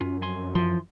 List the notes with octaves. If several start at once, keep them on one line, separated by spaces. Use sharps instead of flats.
F#2 C#4 F4
F2 G#5 C6
E3 F3 C6